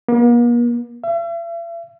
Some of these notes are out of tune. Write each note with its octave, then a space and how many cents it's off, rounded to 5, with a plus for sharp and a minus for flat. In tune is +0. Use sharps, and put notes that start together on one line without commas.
A#3 +45
E5 +45